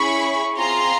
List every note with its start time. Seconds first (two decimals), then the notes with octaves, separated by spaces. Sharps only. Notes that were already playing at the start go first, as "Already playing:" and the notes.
Already playing: C#4 E4 G#4 B5 C#6
0.57 C4 F4 G#4 A#5 C6